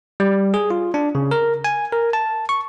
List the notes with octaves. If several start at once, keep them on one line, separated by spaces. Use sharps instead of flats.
G3
G#4
F4
D4
C#3
A#4
G#5
A#4
A5
C#6